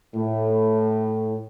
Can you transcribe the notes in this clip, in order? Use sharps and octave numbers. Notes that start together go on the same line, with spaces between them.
A2